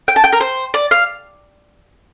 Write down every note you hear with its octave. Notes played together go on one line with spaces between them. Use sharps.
G5
A5
G5
A#4
C5
D5
F5